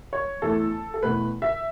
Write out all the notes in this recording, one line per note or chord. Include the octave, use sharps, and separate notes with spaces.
C#5
E2 E3 A3 A4
A4
E2 B2 A3 B4
E5